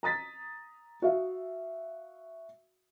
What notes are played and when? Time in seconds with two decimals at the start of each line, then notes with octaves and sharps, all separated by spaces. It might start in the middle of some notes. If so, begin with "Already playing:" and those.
0.03 A#5 D#6 A6 B6
1.02 F#4 E5 F5